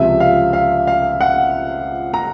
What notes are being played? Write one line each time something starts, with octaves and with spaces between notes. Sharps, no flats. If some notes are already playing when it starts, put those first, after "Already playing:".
Already playing: C#2 C3 F3 E5
F5
F5
F5
F#5
A#5